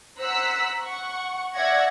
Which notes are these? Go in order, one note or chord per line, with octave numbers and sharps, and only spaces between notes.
C5 F#5 A#5 E6 F#6 B6
F#5 C#6
D5 E5 F#5 C#6 G#6 A#6